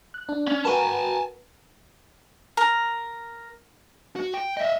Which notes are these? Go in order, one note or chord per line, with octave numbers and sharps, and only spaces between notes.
F#6
D4
C#4
F#4 A#4 B4 G#5 A5
A#4
F#4
G5
D#5 E5